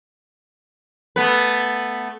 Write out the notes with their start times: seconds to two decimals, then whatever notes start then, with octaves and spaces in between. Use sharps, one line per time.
1.16 A3 B3 B4